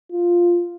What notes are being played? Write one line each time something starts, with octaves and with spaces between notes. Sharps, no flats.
F4